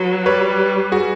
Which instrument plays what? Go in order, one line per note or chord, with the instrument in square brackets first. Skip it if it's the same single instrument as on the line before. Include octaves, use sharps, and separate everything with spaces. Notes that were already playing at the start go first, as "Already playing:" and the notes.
Already playing: [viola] F#3 [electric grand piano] B4
[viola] G3 [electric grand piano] B4 C#5
[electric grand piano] F#4 G#4